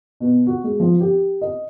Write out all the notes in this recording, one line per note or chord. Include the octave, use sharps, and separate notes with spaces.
B2
F#4
G#3
F3
G4
D#5